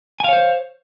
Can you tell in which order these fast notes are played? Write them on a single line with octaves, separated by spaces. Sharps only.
G#5 F5 C#5 C5